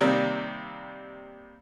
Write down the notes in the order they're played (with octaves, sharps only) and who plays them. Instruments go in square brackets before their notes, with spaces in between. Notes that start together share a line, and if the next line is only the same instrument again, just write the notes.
[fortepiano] C3 D#3 G3 A#3 C4